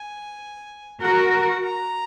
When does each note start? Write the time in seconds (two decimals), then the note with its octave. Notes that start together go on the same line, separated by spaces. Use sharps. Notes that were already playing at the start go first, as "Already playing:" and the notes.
Already playing: G#5
1.01 F#4 A#4 F#5
1.33 F#5
1.64 A#5